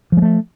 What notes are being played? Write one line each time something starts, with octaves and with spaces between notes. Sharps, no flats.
F3 G#3 A3